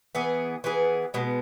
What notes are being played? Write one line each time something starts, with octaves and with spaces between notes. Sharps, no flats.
E3 B3 G#4
E3 B3 G#4
B2 G#3 B3